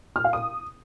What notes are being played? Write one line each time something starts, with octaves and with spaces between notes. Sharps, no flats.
F6
F5
D#6